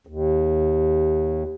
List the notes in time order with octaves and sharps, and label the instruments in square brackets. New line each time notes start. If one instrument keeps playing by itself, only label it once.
[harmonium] D#2